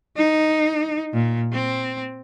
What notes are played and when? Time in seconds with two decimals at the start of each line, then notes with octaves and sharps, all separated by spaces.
0.17 D#4
1.13 A#2
1.52 C4